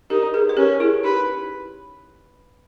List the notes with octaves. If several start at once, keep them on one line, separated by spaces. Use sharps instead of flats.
D#4 G4 A#4
G#4 B4
B4
C#4 G4 A#4
E4 G#4
D#4 G4 B4